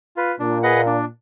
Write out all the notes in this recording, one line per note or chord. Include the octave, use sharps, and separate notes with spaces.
F4 B4
A#2 D4
G#4 B4 D#5 F#5
D4